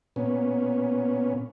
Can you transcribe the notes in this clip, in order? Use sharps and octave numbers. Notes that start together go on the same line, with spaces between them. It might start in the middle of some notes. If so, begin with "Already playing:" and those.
A#2 B3 C#4